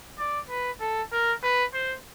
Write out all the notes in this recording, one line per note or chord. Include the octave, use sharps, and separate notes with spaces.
D5
B4
A4
A#4
B4
C5